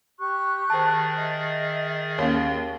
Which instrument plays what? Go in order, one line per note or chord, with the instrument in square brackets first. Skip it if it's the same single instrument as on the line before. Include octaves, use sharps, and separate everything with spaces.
[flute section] G4 C#6 F#6
[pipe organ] D#3 G#4 A6 [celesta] C5 A5
[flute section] D#5 E5
[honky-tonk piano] D#2 C#4 [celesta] C#5